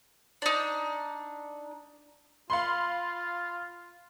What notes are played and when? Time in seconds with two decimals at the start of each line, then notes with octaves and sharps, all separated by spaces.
0.42 D4 D#4
2.50 F4 F5 B5 C6